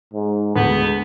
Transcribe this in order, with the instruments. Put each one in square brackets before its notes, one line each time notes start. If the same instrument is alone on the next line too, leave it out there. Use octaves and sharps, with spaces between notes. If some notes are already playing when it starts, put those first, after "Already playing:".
[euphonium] G#2
[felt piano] D2 G#4 [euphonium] G#3 [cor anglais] B3